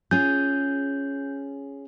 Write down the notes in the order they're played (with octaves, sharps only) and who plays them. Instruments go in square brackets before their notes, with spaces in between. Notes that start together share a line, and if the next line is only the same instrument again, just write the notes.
[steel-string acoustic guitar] C#4 F4 G#4 [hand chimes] G6